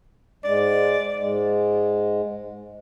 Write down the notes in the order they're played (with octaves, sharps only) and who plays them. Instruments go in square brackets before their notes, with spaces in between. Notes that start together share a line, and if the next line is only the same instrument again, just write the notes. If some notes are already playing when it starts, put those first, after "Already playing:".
[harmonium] G#2 G#3 [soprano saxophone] D5
[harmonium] G#2 G#3